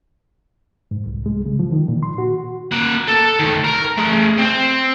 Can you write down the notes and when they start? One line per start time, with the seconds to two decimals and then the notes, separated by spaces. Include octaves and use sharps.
0.91 G#2
1.06 C2
1.26 G#3
1.46 C#3
1.59 F3
1.72 D#3
1.88 A#2
2.03 C6
2.18 F#4
2.72 A#3 F#5
3.08 A4
3.39 D#3 A3
3.64 A#4 A#5
3.97 A3 G#4
4.38 C4 C5